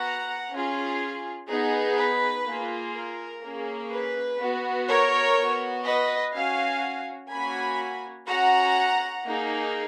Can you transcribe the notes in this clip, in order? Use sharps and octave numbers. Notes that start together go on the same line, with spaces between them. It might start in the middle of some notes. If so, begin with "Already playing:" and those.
Already playing: B3 F#4 F#5 A#5
C#4 F4 G#4
B3 D#4 G#4
B4
A#3 F4 G#4
A#4
A#3 C#4 G#4
B4
B3 F#4
A#4 C#5
B3 F#4
B4 D#5
C#4 F#4 F5 G#5
A#3 C#4 F#4 G#5 B5
C#4 F#4 F#5 A#5
A#3 D#4 G#4